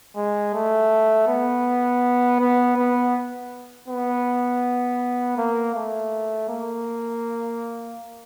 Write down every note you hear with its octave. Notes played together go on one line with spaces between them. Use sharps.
G#3
A3
B3
B3
B3
B3
A#3
A3
A#3